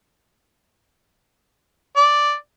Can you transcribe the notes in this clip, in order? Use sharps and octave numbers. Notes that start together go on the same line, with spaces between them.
D5